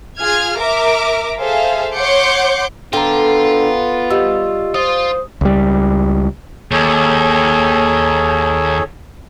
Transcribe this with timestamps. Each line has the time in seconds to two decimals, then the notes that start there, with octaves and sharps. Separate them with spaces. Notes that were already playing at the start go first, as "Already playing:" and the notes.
0.18 F4 G#4 F6 G#6
0.58 A#4 E5 A#5 D6
1.40 G#4 A4 C5 E5 F5
1.96 C#5 F#5 C6 D6 G6 C#7
2.93 D3 B3 F4 G5 A#5
4.10 G3 G4 D#5 E6
4.74 F4 C5 D#6
5.41 C#2 G3
6.71 D#2 G#4 A4 C#5